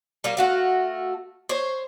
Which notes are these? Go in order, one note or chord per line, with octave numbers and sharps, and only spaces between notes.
G3 A#3 F4
A3 F#4 F5
C5 C#5